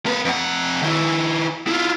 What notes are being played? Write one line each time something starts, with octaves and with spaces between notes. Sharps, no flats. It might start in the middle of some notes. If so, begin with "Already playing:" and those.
A#3 B4
F2 F#5
D#3 E4
E4 F4